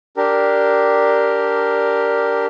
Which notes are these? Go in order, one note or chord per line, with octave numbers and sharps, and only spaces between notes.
D4 G4 A#4